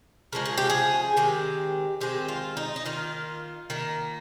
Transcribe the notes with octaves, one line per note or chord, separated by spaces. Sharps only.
C#3 F3 G#3 A#4
G#4
G4
G#4
D#3 G#3 C4 G4
D#3 G#3 C4 G4
F4
D#4
D#4
D#3 A#3 F4
D#3 A#3